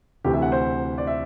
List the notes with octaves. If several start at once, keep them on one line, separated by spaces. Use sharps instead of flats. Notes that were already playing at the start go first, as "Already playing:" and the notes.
D2 C3 E3 G4
E5
F#5
C5
D5
E5